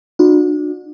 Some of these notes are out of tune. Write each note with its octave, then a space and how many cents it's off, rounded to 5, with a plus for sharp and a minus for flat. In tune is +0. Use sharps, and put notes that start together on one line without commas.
D4 +30 F#4 -35